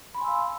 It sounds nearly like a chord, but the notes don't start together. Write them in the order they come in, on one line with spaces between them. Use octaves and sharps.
B5 C6 G#5 E6 F5